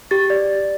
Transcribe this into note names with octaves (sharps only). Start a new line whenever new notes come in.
G4 A6
D5